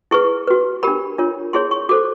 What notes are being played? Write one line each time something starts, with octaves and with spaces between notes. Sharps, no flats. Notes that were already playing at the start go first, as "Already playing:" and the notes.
E4 G#4 B4 C#6
F#4 B4
D4 G4 A#4 B5
D4 F4 A#4 C#5
E4 G#4 C#5 C6
C#6
F#4 A4 C5 D6